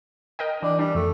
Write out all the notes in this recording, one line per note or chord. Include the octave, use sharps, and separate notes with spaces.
A#4 D#5 G5
E3 D4
G3 D4
F2 A3